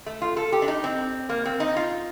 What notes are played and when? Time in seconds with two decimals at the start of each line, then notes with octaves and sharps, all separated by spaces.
0.06 A3
0.22 F4
0.37 A4
0.52 G4
0.62 D4
0.68 D#4
0.84 C4
1.29 A#3
1.46 C4
1.60 D#4
1.77 F4